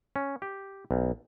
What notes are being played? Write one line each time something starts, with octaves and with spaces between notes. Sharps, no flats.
C#4
G4
B1